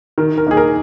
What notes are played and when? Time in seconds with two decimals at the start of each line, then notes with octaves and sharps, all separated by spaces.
0.18 D#3 A#4
0.38 A#4
0.47 A#3 D#4 G#4
0.57 A#4